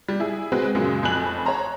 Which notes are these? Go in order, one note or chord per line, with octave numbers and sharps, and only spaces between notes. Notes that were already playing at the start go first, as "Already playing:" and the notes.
G3
E4 G#4
G#3 C4 F#4 B4
F#2 A#2 C#3 F#3 G#3
F1 F2 G#5 B5 F#6 F#7
C#5 A5 A#5 C6